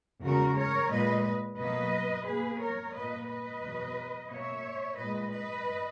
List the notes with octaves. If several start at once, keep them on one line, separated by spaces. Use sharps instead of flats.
E2 C#3 G#3 F#4 A#4
A#4 C#5
A#2 G#3 B4 D#5
B2 F#3 A#3 B4 D#5
B2 A#3 G#4 B4
A#4 C#5
A#2 A#3 B4 D#5
B4 D#5
E2 B2 F#3
B2 A#3 C#5 E5
A#2 G#3 B4 D#5
B4 D#5